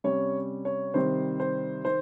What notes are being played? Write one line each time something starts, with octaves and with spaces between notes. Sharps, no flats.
C3 G3 C#4 C#5
C#5
C3 D#3 G3 C4 C5
C5
D#3 C5